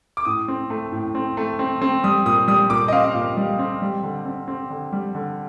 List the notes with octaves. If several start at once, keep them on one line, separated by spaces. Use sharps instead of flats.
D6
A2 D#6
C4
A3
A2
C4
A3
C4
C4
G3 D#6
A#2 D#6
G3 D#6
A#2 D6
D#5
C4 F5
A#2
G3
C4
G3
D3
C4
C4
D3
G3
D3